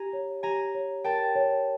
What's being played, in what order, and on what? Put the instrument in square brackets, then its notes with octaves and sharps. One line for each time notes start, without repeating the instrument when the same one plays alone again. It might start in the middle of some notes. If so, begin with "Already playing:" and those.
Already playing: [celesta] G4 [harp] G#5 A#5
[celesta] C#5
[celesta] G4 [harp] G#5 A#5
[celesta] C#5
[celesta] A#4 [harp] G5 A5
[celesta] C#5